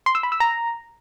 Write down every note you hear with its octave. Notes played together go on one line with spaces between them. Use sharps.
C6
E6
B5
E6
A#5